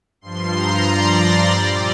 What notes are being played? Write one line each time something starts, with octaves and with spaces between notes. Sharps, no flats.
G2 F3 C6
A#5
D5
D5
A#2 G3 D5